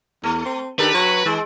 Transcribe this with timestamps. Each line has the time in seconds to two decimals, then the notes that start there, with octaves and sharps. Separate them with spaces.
0.24 E2 A3
0.45 C4
0.79 D#3 D4 G4 A4 B4
0.94 F#3 F#4
1.26 E3 G#3